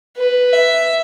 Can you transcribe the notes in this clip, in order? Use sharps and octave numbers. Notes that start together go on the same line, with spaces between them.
B4
E5